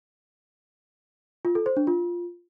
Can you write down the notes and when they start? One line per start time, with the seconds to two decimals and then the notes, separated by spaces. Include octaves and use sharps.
1.45 F4
1.55 A4
1.66 C5
1.77 D4
1.87 F4